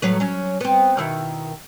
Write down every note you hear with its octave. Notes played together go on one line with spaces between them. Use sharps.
A2 F#3 B4
F#3 C#4
B3 C4
B2 D#3 E4